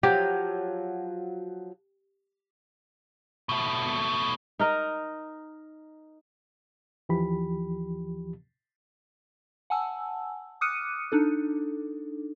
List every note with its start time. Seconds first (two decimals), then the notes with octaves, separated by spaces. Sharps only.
0.03 F3 F#3 G4
3.49 B2 A3
4.59 D#4 A#4 D#5
7.09 D#2 E3 F3 G4 B5
9.70 F#5 G#5 A5 E6
10.61 D6 D#6 F6 F#6 C#7 D#7
11.12 D4 D#4 A4